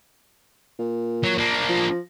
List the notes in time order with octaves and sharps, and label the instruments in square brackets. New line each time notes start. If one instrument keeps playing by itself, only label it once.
[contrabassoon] A#2
[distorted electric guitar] F#3
A#3 D4
[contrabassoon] F3